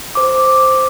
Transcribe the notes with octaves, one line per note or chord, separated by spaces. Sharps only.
C5 D6